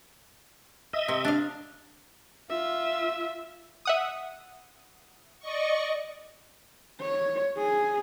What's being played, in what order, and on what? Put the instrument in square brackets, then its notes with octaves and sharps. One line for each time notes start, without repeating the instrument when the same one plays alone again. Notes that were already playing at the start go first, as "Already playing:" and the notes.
[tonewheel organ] D#5 E5
[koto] C3
D4 F5
[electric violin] F4 E5
[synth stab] E5 F#5 D#6
[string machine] D5 D#5 C#6
[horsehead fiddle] C#5
G#4